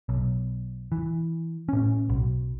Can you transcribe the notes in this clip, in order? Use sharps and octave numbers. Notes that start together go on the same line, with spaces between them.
B1
E3
A2 C#4
B1